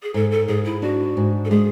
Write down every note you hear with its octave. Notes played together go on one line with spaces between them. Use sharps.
G#4
G#2 A4
A4
G#2 G#4
E4
D4 F#4
G#2
A4
G#3 G#4